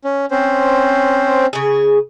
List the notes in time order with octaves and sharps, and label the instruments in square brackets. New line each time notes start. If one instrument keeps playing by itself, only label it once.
[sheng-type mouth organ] C#4
C4 C#4 C5
[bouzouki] C#3 G#4